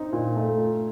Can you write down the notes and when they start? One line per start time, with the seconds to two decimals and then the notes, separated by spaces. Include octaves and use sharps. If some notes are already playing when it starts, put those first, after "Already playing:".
Already playing: C4 D#4
0.13 A#2
0.36 A3
0.58 F4